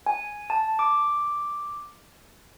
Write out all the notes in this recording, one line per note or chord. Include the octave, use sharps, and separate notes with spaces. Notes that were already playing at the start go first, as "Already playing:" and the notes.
G#5
A5
D6